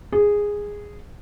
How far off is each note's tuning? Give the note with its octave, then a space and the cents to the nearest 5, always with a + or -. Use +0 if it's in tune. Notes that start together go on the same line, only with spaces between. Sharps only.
G#4 -10